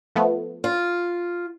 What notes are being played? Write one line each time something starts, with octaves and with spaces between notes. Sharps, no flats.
F3 A3 B3
F4